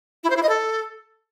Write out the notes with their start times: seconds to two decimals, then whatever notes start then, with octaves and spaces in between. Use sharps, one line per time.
0.24 E4
0.30 C5
0.36 E4
0.43 D#5
0.49 A4